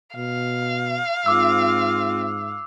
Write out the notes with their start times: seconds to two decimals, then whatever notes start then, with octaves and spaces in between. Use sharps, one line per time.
0.16 B2 F5
1.26 G#2 C4 F4 D6 E6